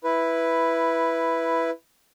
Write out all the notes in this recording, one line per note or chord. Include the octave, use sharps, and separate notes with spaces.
E4 B4